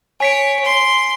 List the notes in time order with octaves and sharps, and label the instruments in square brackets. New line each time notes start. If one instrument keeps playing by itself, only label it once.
[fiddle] C#5 [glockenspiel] G#5 B6 D7
[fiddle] C6